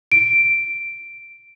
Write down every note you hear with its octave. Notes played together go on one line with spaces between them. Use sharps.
D7